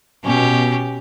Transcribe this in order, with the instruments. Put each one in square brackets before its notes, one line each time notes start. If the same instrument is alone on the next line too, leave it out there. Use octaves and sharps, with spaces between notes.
[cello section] B2 [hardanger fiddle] C#4 G4